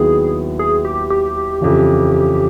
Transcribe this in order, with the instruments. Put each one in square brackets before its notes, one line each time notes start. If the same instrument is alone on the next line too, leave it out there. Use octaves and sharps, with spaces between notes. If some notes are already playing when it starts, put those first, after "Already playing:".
Already playing: [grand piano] D#2 D#3 F#3 B3 E4 [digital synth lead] G#4
[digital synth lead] G#4
G4
G4
[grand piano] F2 C#3 E3